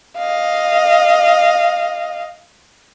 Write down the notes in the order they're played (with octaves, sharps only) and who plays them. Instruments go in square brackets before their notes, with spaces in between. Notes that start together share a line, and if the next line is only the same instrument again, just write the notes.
[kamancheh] D#5 F5